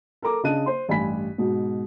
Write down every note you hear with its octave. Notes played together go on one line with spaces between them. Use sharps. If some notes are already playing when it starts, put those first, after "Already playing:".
A4 A#4 A#5 D6
C#3 D4 D#5 A5 F#6 D#7
C5 C6
A1 G2 G#5 B5 B6
G#2 B2